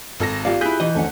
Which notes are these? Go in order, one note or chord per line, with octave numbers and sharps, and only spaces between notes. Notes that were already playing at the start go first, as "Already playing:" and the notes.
G#1 A4 A#6
F4 G4 D5 F5
E4 G#4 F#6 G6 B6
E3 D#5
D2 C#4 F#5